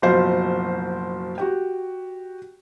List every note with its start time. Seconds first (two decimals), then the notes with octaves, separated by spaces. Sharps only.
0.02 F#1 B2 F3 C5 F5 C6
1.38 F#4 G4